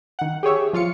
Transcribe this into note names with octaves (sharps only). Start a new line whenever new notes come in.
D#3 F#5
G4 G#4 C#5 E5
F3 F4 F5 C#7